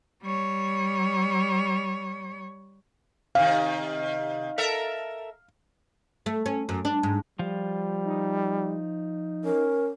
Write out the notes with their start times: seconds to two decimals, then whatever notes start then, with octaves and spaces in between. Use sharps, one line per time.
0.22 G3 C#5
3.35 C3 D#3 F5
4.58 A4 A#4 E5
6.26 A3
6.46 C#4
6.69 F#2
6.85 D4
7.03 G#2
7.39 F3 G3 F4
8.05 D#4
9.44 C#4 A#4